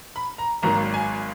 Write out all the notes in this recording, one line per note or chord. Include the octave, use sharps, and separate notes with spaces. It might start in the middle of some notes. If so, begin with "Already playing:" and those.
B5
A#5
G#1 G#2 D#3 F#3 A#3 A#5
G#5